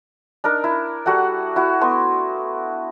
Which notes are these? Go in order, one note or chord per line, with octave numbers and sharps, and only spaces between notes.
D4 D#4 A#4
E4
G3 F#4 A4 F#5
E4 F#4
A3 B3 C6